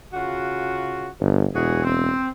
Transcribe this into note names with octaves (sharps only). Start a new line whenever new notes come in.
C#3 F4 F#4
G1
E1 E3 F#4 G#4
C4